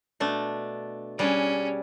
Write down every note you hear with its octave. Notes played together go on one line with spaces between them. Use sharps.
B2 A3 D4
G3 C#4 D4 G#4